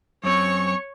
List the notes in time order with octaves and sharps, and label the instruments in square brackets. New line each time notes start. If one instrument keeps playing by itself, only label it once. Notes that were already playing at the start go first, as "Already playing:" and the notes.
[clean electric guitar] F#2 C4 [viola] C#5 C#6